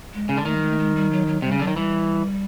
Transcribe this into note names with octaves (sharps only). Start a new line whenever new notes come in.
G#3
C#3
D3
D#3 A3
G3
G#3
A3
G#3
G3
F#3
F#3
C3 G3
C#3
D3 F#3
D#3
E3 G3